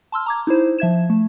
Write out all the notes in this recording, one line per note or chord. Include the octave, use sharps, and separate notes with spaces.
A5 C6 E6 F6
A#5 D6 G#6
D#4 E4 C5
F3 E5 G#6 E7
A3